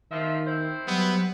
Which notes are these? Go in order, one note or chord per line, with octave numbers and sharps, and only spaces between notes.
D#3 F3 F4 E5
C4 E4 C5
F#3 G3 B3